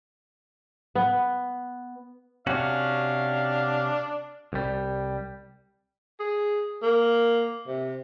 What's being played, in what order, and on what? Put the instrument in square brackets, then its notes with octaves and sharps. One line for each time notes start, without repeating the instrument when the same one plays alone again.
[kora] B3
[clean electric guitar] C3 C#4 F#4 [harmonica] D4 F5
[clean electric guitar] C2 G3
[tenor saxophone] G#4
A#3
C3